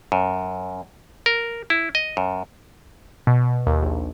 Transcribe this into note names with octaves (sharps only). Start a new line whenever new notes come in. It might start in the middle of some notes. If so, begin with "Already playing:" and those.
F#2
A#4
E4
D#5
F#2
B2
D#2
A#1